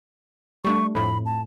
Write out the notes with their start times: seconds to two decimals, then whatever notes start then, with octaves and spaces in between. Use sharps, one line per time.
0.65 G3 A3 D4 C#6
0.95 F2 A2 B5
1.26 A5